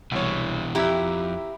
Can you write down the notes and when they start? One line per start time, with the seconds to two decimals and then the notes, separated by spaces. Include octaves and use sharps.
0.12 C2 B2 E3 C#5
0.75 F2 E4 G4 E5 A#5